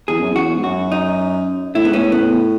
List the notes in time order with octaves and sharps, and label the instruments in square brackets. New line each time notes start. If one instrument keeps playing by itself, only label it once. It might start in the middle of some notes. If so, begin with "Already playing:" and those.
[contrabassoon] E2 [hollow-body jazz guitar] G#4
[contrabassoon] F#2
[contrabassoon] E2 [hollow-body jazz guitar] F#4
[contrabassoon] G#2
[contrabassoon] F#2 [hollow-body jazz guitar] F#4
[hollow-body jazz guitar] D#4
[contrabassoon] A2 [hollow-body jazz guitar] E4
[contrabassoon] G#2 [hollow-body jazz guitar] B3
[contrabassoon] A2 [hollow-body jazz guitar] C#4
[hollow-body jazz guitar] B3